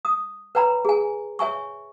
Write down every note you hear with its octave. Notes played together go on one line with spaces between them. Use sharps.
D#6
B4 C#5 G5 A#5 B5
G#4 G#5
C#5 E5 G#5 C#6